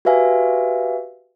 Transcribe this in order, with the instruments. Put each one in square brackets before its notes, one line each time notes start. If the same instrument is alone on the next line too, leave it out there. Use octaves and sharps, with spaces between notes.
[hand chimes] F#4 G4 B4 E5 F5 G#5